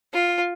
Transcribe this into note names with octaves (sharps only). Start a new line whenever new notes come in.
F4